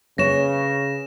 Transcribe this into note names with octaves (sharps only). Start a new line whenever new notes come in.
C#3 B4 C#5 A#6 E7